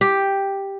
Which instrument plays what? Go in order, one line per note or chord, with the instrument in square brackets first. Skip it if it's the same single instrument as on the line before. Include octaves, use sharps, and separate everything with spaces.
[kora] G4